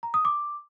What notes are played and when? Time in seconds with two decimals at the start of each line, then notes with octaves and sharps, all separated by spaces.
0.03 A#5
0.14 D#6
0.25 D6